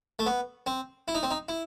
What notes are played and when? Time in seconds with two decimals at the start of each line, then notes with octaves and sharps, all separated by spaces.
0.19 A3
0.26 B3
0.66 C4
1.08 E4
1.15 D#4
1.23 C4
1.31 D#4
1.49 E4